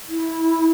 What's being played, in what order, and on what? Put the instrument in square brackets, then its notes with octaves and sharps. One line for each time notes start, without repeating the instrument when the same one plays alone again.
[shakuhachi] E4